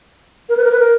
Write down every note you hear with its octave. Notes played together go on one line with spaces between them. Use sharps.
A#4
B4
A#4
B4
A#4